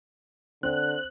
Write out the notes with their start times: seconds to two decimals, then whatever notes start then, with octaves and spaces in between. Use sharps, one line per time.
0.63 D3 C4 F#6